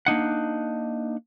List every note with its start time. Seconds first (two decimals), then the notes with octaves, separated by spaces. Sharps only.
0.06 A#3 D4 D#4 F#5